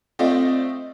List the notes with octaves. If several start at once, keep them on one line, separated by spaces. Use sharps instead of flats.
A3 C4 F4 D5 D#5